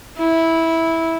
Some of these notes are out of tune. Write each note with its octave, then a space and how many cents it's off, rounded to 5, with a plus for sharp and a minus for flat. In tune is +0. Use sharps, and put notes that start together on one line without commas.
E4 -10